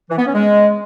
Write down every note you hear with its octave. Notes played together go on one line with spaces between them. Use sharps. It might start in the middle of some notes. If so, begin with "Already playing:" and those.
E3
B3
C#4
G#3